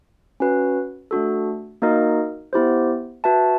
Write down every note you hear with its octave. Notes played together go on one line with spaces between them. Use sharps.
C#4 F#4 B4
A3 D4 F#4 A4
A#3 D#4 F#4 A#4 D#5
B3 E4 G4 C5
F#4 B4 E5 A5